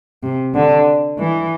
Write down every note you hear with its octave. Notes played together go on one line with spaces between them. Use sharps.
C3
D3
E3